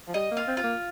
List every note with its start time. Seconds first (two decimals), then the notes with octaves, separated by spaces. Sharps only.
0.08 F3
0.14 G3 D#5
0.31 A#3
0.37 F4
0.47 C4
0.57 F4
0.64 A#3